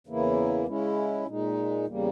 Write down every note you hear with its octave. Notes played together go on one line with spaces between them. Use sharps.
E2 C#3 E3 A#3 E4
C#3 G#3 C#4 E4
A#2 G#3 D#4
E2 C#3 G3 A#3